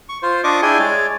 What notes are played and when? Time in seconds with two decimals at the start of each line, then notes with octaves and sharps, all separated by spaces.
0.09 C#6
0.23 F4 C5
0.44 D4 F4 D#5 C#6 D6
0.62 D4 E4 G#4 G5 G#5
0.79 G#3 C#5 D5